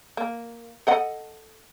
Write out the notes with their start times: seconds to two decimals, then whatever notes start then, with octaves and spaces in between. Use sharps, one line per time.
0.17 A#3
0.87 A4 D#5 F#5